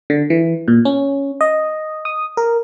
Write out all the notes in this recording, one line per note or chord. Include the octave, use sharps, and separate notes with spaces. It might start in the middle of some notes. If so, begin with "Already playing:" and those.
D3
E3
A#2
C#4
D#5
D#6
A#4